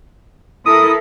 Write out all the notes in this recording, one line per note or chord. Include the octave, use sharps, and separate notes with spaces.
E4 A4 A#4 D#6